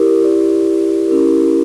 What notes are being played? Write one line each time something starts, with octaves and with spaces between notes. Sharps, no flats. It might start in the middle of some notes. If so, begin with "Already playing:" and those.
Already playing: E4 G4 A#4 D5
E4 G4 A#4 D5
C#4 E4 G4 A#4